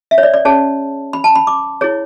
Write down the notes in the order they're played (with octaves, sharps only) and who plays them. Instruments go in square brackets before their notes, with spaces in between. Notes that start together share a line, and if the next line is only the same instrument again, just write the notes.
[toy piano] E5
C#5
D5
D5
C#4 G#4 C#5 A5
B5
A5
B5
D6
E4 G#4 C#5